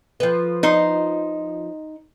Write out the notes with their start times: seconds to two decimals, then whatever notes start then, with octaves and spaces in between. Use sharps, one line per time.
0.20 F3 B4
0.63 D#4 C5